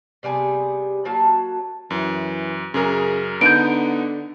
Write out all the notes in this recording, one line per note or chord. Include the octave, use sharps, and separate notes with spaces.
C3 G3 B3 G#4
F#3 A#3 F#4 A5
F#2 E3
F#2 C#3 G#4 A#4
D3 B3 D#4 G6 D7